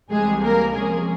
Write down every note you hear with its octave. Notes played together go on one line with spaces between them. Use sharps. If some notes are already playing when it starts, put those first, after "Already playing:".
C2 C3 E3 G3 G#3 G#4
A#3 A#4
C3 F3 G#3 A#3 C#4 G#4